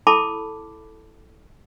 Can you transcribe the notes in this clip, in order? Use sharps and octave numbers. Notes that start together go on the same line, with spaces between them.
E4 A4 A5 B5 D6